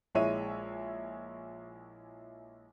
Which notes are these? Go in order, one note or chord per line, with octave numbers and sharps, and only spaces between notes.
A#1 G#3 E4 C#5 E5 D#7